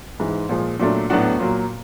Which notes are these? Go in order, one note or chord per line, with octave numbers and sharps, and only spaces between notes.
G#2 E3 G#3
A#2 F3 G#3
A#2 F#3 A3 D4
A2 F#3 B3 D4 F#4
A#2 F#3 A#3